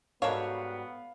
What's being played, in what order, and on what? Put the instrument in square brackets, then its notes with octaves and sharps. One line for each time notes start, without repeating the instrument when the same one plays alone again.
[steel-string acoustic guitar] G#2 G3 F#4 [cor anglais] B3 [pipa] A4 A#4 C#5 [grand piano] F5